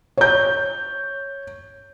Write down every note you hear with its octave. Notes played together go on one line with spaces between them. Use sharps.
C#5 G6